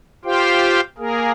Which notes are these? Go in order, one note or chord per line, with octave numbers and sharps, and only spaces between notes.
F4 G4 C5 F5 G5
A#3 G#4 A#4